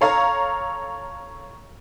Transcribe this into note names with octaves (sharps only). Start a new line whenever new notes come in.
A4 C#5 F5 A#5